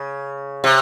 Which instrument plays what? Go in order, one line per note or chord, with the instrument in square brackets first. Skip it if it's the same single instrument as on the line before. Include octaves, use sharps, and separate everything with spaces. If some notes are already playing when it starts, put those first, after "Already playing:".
Already playing: [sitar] C#3
C3